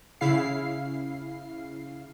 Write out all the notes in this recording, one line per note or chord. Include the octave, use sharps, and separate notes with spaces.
C#3 E4 F5 C7